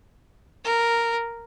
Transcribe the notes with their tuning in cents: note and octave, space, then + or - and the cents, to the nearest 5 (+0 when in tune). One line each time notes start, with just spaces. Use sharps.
A#4 -5